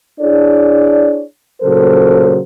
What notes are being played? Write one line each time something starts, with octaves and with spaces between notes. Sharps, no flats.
D4 E4 G#4 C#5 D5
A#2 C#3 F#3 A4 A#4 C5